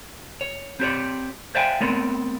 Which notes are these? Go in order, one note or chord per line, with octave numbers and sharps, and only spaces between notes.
C#5
C4 G4 C#5 D5
C5 D5 E5 F5 G5 G#5
A3 B3 C4 A#4 C#5 D5